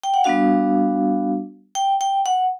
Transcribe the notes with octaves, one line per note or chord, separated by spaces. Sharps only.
G5
F#5
G3 B3 D4 F#4 F5
G5
G5
F#5